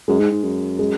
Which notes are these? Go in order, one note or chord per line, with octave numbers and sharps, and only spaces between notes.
F#2 G#3
G#2
G#2
F#2
G#3